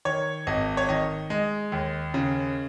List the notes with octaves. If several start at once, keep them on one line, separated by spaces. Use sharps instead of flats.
D#3 C#5
G#1 D#5
C#5
D#3 D#5
G#3 D#5
D#2
C#3